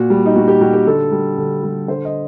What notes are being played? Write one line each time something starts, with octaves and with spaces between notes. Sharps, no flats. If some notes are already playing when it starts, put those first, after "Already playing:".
Already playing: A#2 F#4
G3
D#4
A#2 F#4
G4
G3 F#4
G4
D3 A4
G3
D3
G3
D3 C5
D#5